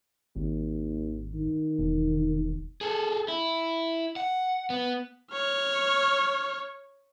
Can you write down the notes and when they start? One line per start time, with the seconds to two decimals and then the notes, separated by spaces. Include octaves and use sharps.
0.36 G#1 D#2
1.34 D#3
1.78 E1
2.81 G#4 A4
3.28 E4
4.16 F#5
4.70 B3
5.33 C#5 F6